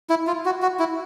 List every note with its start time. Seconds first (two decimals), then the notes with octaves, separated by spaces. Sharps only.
0.10 E4
0.27 F4
0.45 F#4
0.62 F#4
0.79 E4